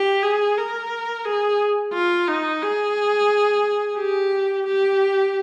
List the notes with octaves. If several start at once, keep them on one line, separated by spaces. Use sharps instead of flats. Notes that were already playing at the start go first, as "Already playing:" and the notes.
Already playing: G4
G#4
A#4
G#4
F4
D#4
G#4
G4
G4